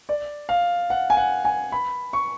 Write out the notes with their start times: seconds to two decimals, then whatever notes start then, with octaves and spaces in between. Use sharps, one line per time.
0.09 D5
0.49 F5
0.90 F#5
1.10 G#5
1.17 F#5
1.45 G#5
1.72 B5
2.13 C#6